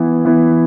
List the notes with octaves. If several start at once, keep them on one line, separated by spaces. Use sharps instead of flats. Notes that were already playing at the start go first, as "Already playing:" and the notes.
Already playing: E3 B3 E4
E3 B3 E4